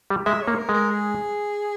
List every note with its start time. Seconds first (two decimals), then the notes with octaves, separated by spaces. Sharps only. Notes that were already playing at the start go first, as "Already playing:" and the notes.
0.10 G3
0.26 G#3 E5
0.42 C#5
0.48 A#3
0.58 A#4
0.69 G#3
0.74 A#4
0.91 G#4